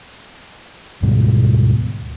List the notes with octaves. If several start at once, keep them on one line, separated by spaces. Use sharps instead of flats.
D2 G#2 B2 G3